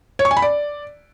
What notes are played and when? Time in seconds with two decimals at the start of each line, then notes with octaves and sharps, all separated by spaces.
0.19 C#5
0.25 C#6
0.31 G#5
0.37 B5
0.42 D5